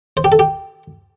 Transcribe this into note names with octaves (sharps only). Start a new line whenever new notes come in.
C5
G4
A4
G4